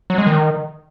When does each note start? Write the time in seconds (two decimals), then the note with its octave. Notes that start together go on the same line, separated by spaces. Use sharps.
0.10 F#3
0.18 G#3
0.26 D#3